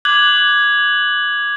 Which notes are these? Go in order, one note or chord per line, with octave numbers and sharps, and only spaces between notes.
D6 F#6 G#6 F#7